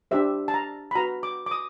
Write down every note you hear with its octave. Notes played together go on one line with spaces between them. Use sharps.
D4 G4 C5 E5
A5
A#5
B5
F#4 B4 A#5
D6
D6
D#6